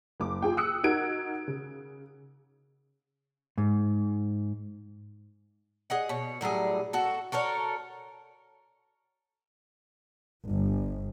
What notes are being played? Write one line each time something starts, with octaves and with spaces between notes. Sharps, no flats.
F#1 D6
F4 G#4 G5
D#6 E6 F#6 C#7
D#4 F#4 A#4 G#6 D7
C#3
G#2
G#4 D#5 F#5
B2 C#5
A2 F#3 G3 G#4
F#4 A4
F#4 A4 A#4 C#5
G1